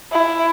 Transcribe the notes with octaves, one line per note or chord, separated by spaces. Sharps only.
E4